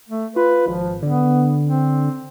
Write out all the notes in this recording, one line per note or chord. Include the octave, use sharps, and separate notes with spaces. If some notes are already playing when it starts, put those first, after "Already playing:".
A3
F4 B4
G#1 F3
D3 B3
C4